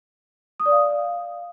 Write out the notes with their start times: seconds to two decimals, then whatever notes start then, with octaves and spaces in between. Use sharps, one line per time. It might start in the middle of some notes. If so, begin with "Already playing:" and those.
0.60 D#6
0.66 D5
0.72 F5